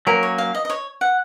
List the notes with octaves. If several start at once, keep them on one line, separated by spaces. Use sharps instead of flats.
F#3 A#3 C#4 A#4
C#5
F5
D#5
D#5
C#5
F#5